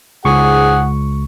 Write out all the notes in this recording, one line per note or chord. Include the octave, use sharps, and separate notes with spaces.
C#2 G#2 G#4 F#5 C#6